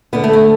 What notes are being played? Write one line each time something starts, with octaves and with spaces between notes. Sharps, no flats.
D2 D3 B3
A3
B3